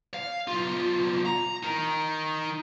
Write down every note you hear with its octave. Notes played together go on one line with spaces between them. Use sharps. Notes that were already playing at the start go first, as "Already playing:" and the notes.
F5
B1 F4
A#5
D#4 A#4